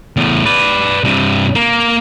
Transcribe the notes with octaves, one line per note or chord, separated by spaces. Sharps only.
E2 A2
B4 D5
G2 C3
A#3